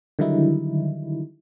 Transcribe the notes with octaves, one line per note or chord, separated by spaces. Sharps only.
D3 D#3 F#3 G3 D#4 E4